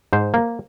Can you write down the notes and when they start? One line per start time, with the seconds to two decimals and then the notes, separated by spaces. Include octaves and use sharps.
0.13 G#2 C5
0.34 A#3